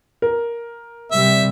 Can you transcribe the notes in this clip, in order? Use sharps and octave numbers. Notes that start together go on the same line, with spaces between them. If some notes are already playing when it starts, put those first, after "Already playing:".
A#4
C3 G3 E5